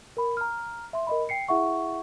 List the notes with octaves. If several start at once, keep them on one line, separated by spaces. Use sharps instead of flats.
A#4 B5
A#5 F6
E5 C6
A#4 D#5 B5
G5 C7 C#7
E4 G#4 E5 F#5 C#6